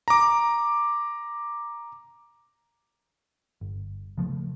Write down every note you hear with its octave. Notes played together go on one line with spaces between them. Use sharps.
A#5 D6
G1
C#3 F3 G#3 A3